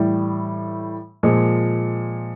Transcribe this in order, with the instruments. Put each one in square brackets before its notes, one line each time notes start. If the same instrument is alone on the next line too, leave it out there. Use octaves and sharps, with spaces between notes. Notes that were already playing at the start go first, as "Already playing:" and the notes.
Already playing: [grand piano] A2 E3 G3
A#2 F3 G#3